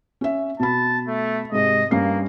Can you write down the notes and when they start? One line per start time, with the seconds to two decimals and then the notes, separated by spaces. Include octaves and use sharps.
0.21 C#4 E5
0.60 B2 A5 B5
1.07 A3
1.52 G#2 C3 G#3 D#5
1.91 G2 A#3 C#4 C7